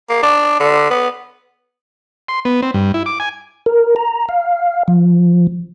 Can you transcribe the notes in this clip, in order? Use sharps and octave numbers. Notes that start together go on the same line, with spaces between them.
A#3
D4
D3
B3
C6
B3
C4
G2
E4
D6
G#5
A#4
A#5
F5
F3